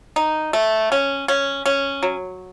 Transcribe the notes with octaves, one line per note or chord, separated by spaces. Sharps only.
D#4
A3
C#4
C#4
C#4
F#3